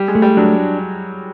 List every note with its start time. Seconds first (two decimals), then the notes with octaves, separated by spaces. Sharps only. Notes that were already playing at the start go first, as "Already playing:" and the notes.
Already playing: G3
0.08 G#3
0.15 A3
0.22 G3
0.37 F#3 D4